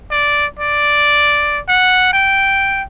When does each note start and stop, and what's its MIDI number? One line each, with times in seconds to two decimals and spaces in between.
0.11 0.46 74
0.59 1.59 74
1.68 2.12 78
2.13 2.83 79